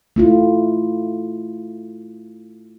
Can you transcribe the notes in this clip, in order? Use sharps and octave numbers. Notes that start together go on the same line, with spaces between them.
A3 E4 F4